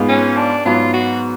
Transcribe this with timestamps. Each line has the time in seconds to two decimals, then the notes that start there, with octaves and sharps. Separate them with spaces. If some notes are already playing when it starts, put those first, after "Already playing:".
Already playing: G#2 G#3 B3 F4
0.09 C#4
0.36 D4
0.65 G#2 F#3 B3 F4
0.93 F#4